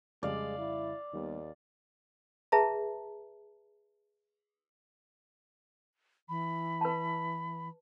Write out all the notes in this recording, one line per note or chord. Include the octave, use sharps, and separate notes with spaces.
F2 C#3 G3 G#3 D5 F5
E4
D#2 D#3 G3 B3
G#4 B4 E5 A5 A#5
E3 B5
B4 A5